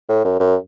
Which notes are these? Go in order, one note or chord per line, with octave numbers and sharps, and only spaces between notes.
A2
F#2
F#2